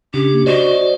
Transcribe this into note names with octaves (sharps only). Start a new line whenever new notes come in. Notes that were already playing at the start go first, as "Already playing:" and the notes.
C#3 C#4 D4 G4
A#3
F#4 C5 D5 D#5